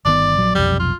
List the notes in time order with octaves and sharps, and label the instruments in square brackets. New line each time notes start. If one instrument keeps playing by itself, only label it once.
[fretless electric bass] G1 D#3 B3 [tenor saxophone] D5
[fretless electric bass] A#1 F#3
[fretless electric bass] F1 B1 F2 [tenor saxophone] G3
[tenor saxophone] F4